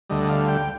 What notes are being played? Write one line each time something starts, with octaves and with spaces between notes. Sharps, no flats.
D2 D3 G3 D#5
F5
G5